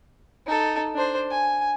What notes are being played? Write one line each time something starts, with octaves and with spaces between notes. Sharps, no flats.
D#4 A4
D4 C5
G#5